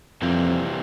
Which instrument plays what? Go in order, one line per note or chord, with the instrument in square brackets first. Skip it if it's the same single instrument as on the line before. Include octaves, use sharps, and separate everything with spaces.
[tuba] F2 [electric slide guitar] C3 E3 G3 A#3